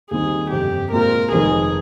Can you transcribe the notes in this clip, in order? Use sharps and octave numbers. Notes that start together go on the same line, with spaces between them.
D#2 D#3 G3 C4 D#4 G#4
G1 F2 C3 G4
A#2 G#3 C4 F4 A#4
F1 F2 D#3 G#3 D#4 G#4